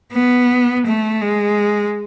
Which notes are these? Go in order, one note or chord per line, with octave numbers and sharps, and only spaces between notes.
B3
A3
G#3